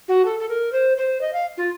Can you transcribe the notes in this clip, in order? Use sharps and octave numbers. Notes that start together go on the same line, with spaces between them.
F#4
A4
A4
A#4
C5
C5
D#5
F5
F4